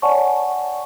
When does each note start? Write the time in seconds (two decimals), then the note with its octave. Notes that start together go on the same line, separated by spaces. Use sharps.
0.02 C#5 D5 F#5 G#5 A5 C#6